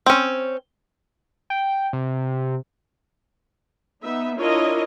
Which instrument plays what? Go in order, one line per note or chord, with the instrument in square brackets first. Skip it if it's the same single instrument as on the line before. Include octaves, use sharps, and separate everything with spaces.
[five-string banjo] C4 C#4
[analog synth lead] G5
C3
[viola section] B3 D#4 E5
D4 E4 F4 A#4 C#5 D#5